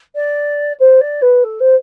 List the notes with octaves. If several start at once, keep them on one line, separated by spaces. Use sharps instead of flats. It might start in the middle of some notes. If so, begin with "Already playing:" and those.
D5
C5
D5
B4
A4
C5